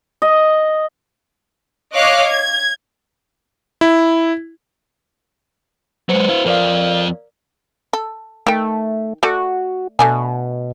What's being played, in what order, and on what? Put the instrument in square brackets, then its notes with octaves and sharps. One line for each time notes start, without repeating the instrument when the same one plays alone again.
[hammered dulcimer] D#5
[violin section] C#5 D#5 F5 D6 F#6
G#6
[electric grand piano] E4
[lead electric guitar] F#3 G#3 [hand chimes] B4 C5 C#7
[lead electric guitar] E4 F5
[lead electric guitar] F2 F3 [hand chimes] A#4 D5 F5
[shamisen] A4
[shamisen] D#3 G5 [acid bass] A3
[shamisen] A3 D5 [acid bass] F#4
[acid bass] B2 [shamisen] A3 D4 G#5